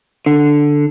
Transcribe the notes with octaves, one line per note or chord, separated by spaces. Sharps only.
D3